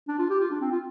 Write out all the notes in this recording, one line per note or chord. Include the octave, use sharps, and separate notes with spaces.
D4
F4
G4
F4
D4
C4
F4